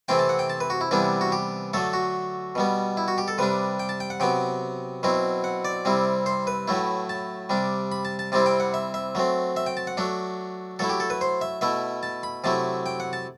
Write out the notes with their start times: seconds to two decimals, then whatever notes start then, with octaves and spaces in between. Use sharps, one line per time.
0.08 C3 E3 A3 C4 E4 G5
0.19 A5
0.29 F#5
0.39 G5
0.50 A5
0.60 B4
0.70 F#4
0.81 E4
0.91 C3 E3 G3 B3 D4 E4
1.21 F#4
1.32 G4
1.73 D3 F#3 A3 A4
1.93 F#4
2.55 B2 G3 B3
2.97 E4
3.08 F#4
3.18 G4
3.28 A4
3.38 C3 G3 D4 B4
3.79 G5
3.89 A5
4.00 G5
4.10 F#5
4.20 C3 F#3 B3 G5
5.03 B2 F#3 C4 E4
5.44 F#5
5.65 D5
5.85 C3 G3 C4 E4
6.26 C5
6.47 B4
6.68 A2 F#3 A3 E4
7.09 A5
7.50 C3 G3 D4
7.92 B5
8.05 A5
8.19 A5
8.32 C3 G3 C4 E4 A5
8.46 G5
8.60 F#5
8.74 E5
8.94 E5
9.15 F#3 A3 C4
9.57 E5
9.66 G5
9.77 A5
9.87 F#5
9.97 F#3 A3 D4
10.79 F#3 A3 E4 A4
10.89 G4
11.00 A4
11.10 B4
11.21 C5
11.41 E5
11.61 B2 A3 E4 E5
12.03 A5
12.23 B5
12.44 C3 F#3 A3 E4 A5
12.86 G5
13.00 F#5
13.13 A5